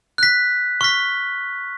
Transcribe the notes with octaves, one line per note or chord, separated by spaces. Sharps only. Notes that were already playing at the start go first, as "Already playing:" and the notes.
F#6 B6
C#6 F6 B6